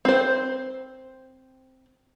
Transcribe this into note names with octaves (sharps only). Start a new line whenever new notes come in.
C4 C5